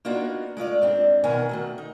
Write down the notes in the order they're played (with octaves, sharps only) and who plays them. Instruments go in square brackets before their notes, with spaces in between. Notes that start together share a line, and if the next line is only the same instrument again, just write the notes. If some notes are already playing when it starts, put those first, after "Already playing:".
[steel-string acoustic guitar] A#3 B3 D4 D#4 F4 F#4
G#3 A3 F4 D5
G#2 C4 D4
B2 D#3 B3 A#4 F#5 G#5
D#3 A3 F#4
D#4